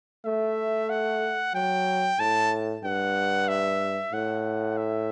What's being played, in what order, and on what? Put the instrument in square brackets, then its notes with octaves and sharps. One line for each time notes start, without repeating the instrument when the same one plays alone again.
[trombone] A3 [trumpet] E5
[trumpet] F#5
[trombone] F#3 [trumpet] G5
[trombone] A2 [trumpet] A5
[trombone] G2 [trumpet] F#5
[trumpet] E5
[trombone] A2 [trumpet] F#5
[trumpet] E5